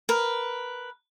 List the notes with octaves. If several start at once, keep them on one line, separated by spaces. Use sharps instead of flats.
A#4 B4